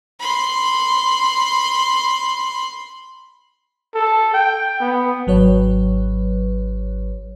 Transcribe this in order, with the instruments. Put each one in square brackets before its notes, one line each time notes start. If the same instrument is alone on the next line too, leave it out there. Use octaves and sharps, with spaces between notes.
[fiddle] B5 C6
[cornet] A4
G5
B3
[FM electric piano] G#1 F#3 B4 C#5